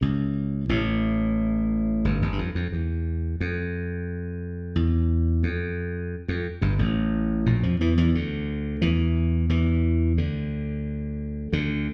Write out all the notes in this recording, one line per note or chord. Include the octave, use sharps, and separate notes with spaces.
C#2 C#3
A1 A2
G1 G2
G1 G2
G2
F2
F2
E2
F2
E2
F2
F2
G1 G2
A1 A2
A#1 A#2
F2 F3
E2 E3
E2 E3
D2 D3
E2 E3
E2 E3
D2 D3
D2 D3